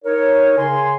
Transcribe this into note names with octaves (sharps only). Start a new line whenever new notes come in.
D#4 A#4 C#5
C#3 G#5 C6